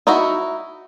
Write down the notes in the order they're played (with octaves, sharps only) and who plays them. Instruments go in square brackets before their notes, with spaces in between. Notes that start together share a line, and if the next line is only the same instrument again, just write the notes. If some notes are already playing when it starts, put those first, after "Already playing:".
[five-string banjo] D#4 E4 F#4